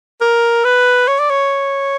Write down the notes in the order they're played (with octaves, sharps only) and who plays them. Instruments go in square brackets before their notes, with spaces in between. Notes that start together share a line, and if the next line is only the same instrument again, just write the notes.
[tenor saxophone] A#4
B4
C#5
D5
C#5